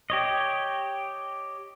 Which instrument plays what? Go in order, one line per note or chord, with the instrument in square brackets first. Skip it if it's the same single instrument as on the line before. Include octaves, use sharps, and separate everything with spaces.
[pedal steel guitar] G4 C#5 D#5